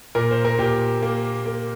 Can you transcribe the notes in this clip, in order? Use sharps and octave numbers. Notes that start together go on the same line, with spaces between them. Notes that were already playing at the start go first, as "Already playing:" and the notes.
A#2 A#4
C5
A#4
A#2 G4
A#3
A#3